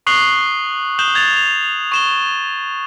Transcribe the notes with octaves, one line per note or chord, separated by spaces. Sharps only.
C#6 D#6 F#6 C7 F#7 G7
D#6 F#6 G6 E7 F#7 G7
G#6 A6 F7
F7
C#6 E7 G7